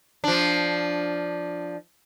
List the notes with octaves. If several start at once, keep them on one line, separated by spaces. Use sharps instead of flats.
F3 D4